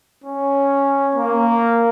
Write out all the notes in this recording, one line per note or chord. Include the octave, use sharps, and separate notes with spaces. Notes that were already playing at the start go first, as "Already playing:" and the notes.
C#4
A#3